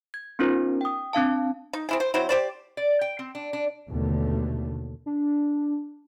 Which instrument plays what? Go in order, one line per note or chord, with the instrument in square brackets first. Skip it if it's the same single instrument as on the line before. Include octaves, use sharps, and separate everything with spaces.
[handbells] G#6
B3 C#4 D#4 F4 A#4 C5
G5 D#6
C4 D4 F5 A5
[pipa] D#4
C4 E4 G#4
C5
F#3 C4 E4 C5
G4 C5 D5
[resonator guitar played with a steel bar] D5
G5
C4
D4
D4
[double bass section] D#2 B2 D3 A3
[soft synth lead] D4